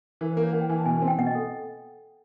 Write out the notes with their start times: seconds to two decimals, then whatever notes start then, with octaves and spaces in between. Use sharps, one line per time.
0.21 E3 A#4
0.32 C5
0.37 A#3
0.43 C#5
0.53 A#3 F#5
0.61 G5
0.69 E3 G#5
0.78 A5
0.86 B2 G#5
0.98 C4 G#5
1.07 G5
1.18 B2 F#5
1.27 D#5
1.35 A4